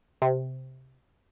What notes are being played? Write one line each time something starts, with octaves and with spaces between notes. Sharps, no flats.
C3